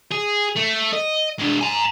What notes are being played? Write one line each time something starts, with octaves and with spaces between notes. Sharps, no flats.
G#4
A3
D#5
G#3 D4
G#5 A#5